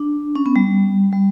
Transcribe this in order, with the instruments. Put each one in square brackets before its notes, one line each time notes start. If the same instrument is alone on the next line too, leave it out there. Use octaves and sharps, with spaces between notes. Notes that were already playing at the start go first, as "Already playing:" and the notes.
Already playing: [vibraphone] D4
C#4
B3
G3
G3